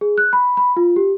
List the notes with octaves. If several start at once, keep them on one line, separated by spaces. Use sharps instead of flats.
G#4
F#6
B5
B5
F4
G4